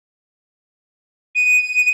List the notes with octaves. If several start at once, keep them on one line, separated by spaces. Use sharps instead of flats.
D#7